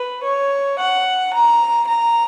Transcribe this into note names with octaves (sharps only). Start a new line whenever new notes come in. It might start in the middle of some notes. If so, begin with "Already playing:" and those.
Already playing: B4
C#5
F#5
A#5
A#5